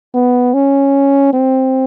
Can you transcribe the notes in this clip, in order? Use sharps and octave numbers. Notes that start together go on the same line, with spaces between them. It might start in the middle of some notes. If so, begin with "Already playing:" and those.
B3
C#4
C4